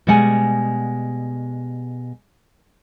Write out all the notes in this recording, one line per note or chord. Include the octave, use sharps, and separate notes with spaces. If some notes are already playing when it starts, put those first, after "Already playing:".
B2 G3 G#3 F#5 G#5